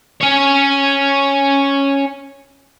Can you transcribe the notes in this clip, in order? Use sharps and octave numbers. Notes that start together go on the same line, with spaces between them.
C#4 C#5